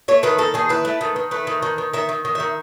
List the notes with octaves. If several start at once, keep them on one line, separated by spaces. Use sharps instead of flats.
A3 C#5
D#3 B4
D#3 A4
D#3 G#4
E4 B4
A3
D#3
D#3
A3 B4
D#3
D#3
D#3
D#3 E5
D#3
D#3
D#3 E5